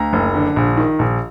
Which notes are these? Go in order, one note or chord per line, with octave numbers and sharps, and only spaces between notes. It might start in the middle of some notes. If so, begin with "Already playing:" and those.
Already playing: D2 A#5
F#1
D3
A#1
D#3
A#1